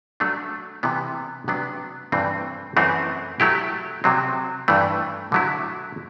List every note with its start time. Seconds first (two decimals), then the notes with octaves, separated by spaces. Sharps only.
0.20 F#3 A3 D4
0.83 C3 E3 B3
1.48 C3 F#3 B3 D4
2.12 G2 E3 A3 C4
2.76 F#2 E3 A3 C4
3.40 F#3 A3 E4 G4
4.04 C3 F#3 C4
4.68 G2 E3 A3
5.32 D3 F#3 A3 E4